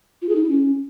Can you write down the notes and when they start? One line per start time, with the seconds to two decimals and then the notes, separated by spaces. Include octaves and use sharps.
0.22 F4
0.29 G#4
0.36 D#4
0.43 E4
0.50 C#4